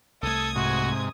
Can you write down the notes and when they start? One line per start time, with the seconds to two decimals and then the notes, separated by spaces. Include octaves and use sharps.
0.23 C2 A3 A4 D#6 G#6
0.56 G#2 C3 F#4